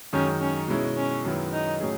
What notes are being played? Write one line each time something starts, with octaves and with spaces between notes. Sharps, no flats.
F#2 D#3 G#3 C#4 D#4
C#4
B2 G#3 C#4 E4
C#4
F#2 D#3 G#3 B3 E4
D#4
A2 F#3 C#4 G#4